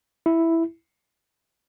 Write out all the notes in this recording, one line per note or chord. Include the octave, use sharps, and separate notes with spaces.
E4